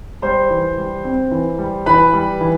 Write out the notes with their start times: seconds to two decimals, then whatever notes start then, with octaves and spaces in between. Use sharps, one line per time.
0.22 G3 C5 C6
0.50 E3
0.78 G3
1.05 C4
1.31 E3
1.58 G3
1.86 E3 B4 B5
2.13 G3
2.41 E3